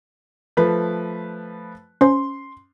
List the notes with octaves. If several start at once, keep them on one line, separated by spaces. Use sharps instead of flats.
F3 A3 B4
C#4 C5 C6